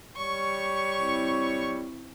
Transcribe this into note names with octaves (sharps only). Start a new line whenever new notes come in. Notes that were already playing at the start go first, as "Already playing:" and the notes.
G3 C#5 C#6
C4 E4